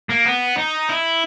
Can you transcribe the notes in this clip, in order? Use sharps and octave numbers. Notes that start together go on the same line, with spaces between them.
A#3
B3
D#4
E4